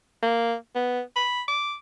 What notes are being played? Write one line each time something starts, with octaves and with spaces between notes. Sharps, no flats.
A#3
B3
B5
D6